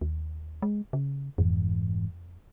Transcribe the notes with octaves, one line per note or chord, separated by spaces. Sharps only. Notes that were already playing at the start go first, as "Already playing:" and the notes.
D#2
G#3
C#3
F1 F2 G#2 E3